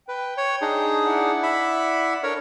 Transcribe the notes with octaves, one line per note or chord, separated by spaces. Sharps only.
B4 G5
C#5
D4 D#4 G#4
E4 D5 F#5
E5 B5
D4 A4 A#4 C#5